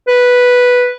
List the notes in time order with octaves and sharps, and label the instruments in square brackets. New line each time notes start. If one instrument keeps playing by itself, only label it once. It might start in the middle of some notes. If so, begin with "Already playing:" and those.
[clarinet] B4